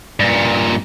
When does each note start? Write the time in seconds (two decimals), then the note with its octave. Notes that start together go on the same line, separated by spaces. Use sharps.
0.20 G2 A#2